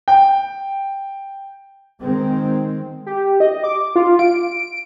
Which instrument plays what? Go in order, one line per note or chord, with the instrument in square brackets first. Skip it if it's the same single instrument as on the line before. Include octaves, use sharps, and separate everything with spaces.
[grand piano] G5
[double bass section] D#3 G#3 C4
[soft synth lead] G4
D#5
D6
F4
D7